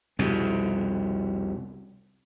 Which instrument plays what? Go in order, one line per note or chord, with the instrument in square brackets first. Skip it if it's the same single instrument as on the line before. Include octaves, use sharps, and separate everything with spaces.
[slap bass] C2 F2 B2